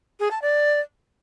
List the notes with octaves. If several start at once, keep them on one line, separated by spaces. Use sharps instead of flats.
G#4
A5
D5